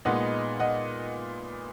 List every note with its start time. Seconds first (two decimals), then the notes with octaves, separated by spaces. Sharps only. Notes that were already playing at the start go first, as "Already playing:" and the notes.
0.05 A#2 G#3 B3 D#4 D#5 F#5
0.60 D#5 F#5